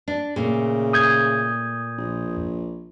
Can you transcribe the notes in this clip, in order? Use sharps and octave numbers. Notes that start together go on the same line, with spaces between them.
D4
A#2 C#3 A3
D#6 G6 G#6
A#1